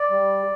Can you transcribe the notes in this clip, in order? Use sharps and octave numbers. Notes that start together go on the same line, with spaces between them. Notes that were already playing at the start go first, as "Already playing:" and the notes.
Already playing: D5
G3